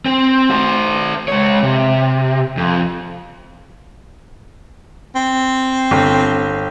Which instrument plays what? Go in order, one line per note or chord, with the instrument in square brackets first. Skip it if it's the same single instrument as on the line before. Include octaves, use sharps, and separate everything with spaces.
[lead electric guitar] C4
F#4 C5
G#3 C#5
C3
F2
[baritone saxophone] C4
[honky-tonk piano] G1